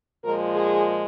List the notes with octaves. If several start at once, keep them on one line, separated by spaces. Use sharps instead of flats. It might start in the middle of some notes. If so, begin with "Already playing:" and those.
A#2 F3 G#3 A#4
G#4